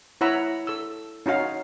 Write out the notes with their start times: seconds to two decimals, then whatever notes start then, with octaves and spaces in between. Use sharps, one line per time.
0.21 E4 C#5 F#5 A#5 B5 E6
0.67 A4 E6
1.26 C#4 D#4 F#4 F5